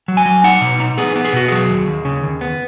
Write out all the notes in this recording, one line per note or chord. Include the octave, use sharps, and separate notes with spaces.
F#3
G#5
F#3
D#4 F#5
B2
D#4
B3 G#4
B3
G#4
B2 F#4
F#3 G#4
D#2
D#2
C#3
D#2
B3